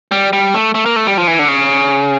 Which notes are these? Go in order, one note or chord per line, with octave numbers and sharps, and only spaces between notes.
G3
G3
A3
A3
A#3
A3
G3
F3
E3
D3
C#3